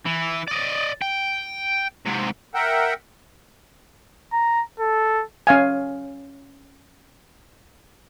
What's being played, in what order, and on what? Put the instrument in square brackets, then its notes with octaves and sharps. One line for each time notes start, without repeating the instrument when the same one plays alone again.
[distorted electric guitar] E3
D5 D#5
G5
G#2 C3
[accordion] A#4 E5 F#5 G5
[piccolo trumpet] A#5
A4
[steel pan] C#4 F5 G#5